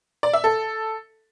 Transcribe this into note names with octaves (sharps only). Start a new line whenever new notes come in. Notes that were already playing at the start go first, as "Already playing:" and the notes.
D5
E5
A4